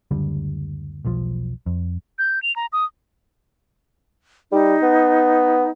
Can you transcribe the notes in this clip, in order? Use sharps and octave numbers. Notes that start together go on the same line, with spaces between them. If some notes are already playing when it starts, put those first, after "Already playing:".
F#1 D2 D3 G3
E1 B1 F3
F2
G6
F7
A#5
D#6
G3 D#4
B3